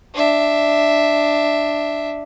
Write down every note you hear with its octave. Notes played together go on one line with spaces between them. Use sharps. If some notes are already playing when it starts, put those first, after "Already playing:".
D4 E5